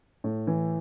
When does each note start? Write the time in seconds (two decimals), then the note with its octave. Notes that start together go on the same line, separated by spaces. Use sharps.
0.24 A2
0.47 E3